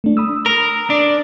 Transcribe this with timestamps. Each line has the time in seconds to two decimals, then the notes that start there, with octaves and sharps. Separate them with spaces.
0.04 A3 D4
0.17 B5 D#6 E6
0.46 A#4
0.90 D4